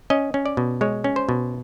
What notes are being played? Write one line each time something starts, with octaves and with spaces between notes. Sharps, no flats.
C#4 D#5
C#4
D5
B2
G#3 C#5
C#4
C5
B2